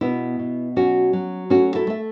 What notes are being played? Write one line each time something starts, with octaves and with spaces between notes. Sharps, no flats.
B2 B3 E4
B2
F#3 C#4 F#4
F#3
A3 C#4 F#4
E4 A4
A3 E5